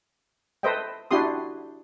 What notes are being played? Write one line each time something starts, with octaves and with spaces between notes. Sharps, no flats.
A4 B4 C5 D#5 E5 G5
D4 E4 F#4 G4 C6 D#6